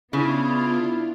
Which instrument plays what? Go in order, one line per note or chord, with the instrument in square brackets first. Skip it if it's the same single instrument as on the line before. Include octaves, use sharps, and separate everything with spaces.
[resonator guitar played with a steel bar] C#3 [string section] B3 D4 F4 [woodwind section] E4